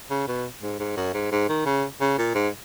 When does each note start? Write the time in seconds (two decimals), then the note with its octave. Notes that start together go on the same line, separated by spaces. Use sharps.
0.11 C#3
0.28 B2
0.62 G#2
0.80 G#2
0.97 F#2
1.14 G#2
1.32 G#2
1.49 D#3
1.66 C#3
2.01 C#3
2.18 A#2
2.35 G#2